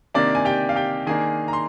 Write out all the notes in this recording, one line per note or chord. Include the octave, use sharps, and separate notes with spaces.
C3 D#3 A#3 D4 D5
G#5
G4 G5
F5
G4 G5
D#3 A#3 D4 G#4 G#5
A#5
C6